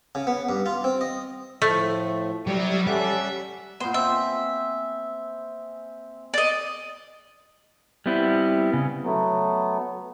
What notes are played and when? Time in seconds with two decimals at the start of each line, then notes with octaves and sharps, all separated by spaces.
0.15 C#3
0.27 B3
0.49 G2
0.66 F4
0.84 C4
1.01 D#5
1.62 A2 F3 A3
2.47 C3 F#3 G3 G5
2.87 C#4 A4 E5 F#5
3.80 A#2 B3 C5
3.94 C4 G#4 E5
6.34 D5 D#5
8.06 G3 B3 C4 E4
8.74 C#3
9.03 F#3 A3 B3